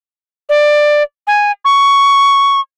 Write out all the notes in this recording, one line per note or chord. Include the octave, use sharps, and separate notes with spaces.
D5
G#5
C#6